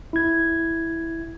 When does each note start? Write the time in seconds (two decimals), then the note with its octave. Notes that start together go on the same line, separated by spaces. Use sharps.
0.13 E4 G#6